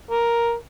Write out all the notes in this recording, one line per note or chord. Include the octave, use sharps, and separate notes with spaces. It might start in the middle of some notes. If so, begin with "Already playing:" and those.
A#4